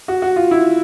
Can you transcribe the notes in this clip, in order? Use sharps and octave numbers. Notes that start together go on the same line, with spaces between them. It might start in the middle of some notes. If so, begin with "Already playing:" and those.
F#4
F#4
F4
E4